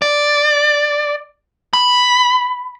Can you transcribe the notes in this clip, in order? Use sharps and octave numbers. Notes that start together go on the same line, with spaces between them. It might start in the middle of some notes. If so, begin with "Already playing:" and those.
D5
B5